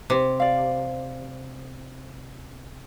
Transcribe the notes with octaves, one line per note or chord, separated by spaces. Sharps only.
C3
D5 F5